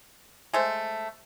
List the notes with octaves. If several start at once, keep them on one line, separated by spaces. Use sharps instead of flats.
G#3 A3 C5